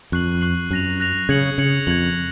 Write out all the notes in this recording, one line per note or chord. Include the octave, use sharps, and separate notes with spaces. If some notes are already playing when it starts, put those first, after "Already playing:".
F2 C#6 F#6 C7 F#7
C#6 F#6 C7 F#7
F#2 F#6 A#6 F7
F#6 A#6 F7
C#3 G#6 C#7 F#7
C#3 G#6 C#7 F#7
F2 G#6 C#7 F#7